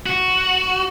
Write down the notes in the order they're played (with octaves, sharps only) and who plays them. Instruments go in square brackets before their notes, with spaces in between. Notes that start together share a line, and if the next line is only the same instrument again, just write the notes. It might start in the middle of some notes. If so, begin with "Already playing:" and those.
[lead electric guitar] F#4